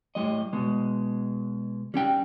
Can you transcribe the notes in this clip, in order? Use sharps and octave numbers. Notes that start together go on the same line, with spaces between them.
A2 G3 D#5
B2 G#3
G3 C#4 G5